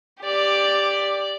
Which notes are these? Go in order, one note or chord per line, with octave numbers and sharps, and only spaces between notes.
G4 D5